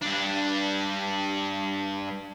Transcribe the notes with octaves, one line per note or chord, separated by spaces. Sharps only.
G2 D4